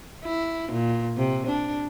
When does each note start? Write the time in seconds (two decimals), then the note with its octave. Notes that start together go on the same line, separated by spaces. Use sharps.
0.24 E4
0.72 A#2
1.17 C3
1.47 D4